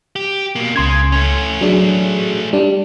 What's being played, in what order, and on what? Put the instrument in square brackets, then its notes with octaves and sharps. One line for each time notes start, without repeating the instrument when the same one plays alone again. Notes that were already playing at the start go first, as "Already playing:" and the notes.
[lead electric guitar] G4
B2 A#3
[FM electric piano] C#2 C6 G#6 [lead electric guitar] C#3
[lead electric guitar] A3 C#4
[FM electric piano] F#3 D4 G#4
G3 D4